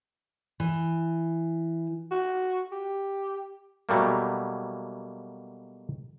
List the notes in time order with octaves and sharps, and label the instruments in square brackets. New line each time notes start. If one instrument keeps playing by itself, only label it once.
[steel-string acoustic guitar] E3
[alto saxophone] F#4
G4
[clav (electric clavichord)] B2 F#3 G3 A3 A#3